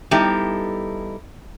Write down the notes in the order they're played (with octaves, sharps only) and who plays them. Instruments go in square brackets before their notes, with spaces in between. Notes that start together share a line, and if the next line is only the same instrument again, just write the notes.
[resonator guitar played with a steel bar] G3 B3 D#4 E4 G4 A4